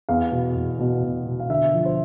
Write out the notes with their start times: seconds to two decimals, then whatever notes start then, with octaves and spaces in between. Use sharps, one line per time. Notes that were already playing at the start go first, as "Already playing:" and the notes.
0.09 E2 F5
0.32 B2
0.55 E2
0.79 B2
1.03 B2
1.26 B2
1.40 F5
1.49 D3 E5
1.73 F3
1.85 C5